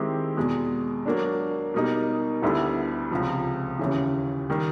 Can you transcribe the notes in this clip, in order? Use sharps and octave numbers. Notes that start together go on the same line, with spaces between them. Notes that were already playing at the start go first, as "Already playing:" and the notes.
Already playing: D#3 G#3 C4 E4 G4
E2 B2 G#3
F#3 A#3 D4
B2 G3 A#3 D#4
D2 D3 G3 B3 E4
C#2 C3 F3
D#2 C#3 E3
D#3 G3